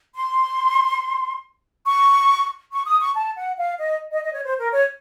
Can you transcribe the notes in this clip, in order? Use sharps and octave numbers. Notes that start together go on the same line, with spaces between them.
C6
C#6
C#6
D#6
C#6
A5
F#5
F5
D#5
D#5
D#5
C#5
C5
A#4
C#5